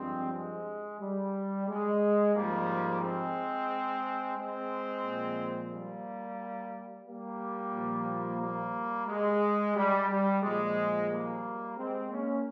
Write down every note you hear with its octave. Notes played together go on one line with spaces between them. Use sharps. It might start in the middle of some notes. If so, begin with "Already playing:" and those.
Already playing: G2 F3 G#3 C4
G#3
G3
G#3
G#2 F3 G3 A#3
G#3 C4
G#3 C4
A#2 F3
G3 A#3
G3 A#3
A#2 F3
G3 A#3
G#3
G3
G3
A#2 F3 G#3
G3 A#3
G#3 C4
A#3 C#4